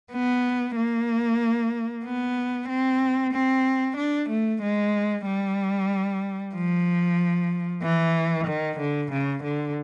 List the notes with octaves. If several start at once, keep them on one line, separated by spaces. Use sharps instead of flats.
B3
A#3
B3
C4
C4
D4
A3
G#3
G3
F3
E3
D#3
D3
C#3
D3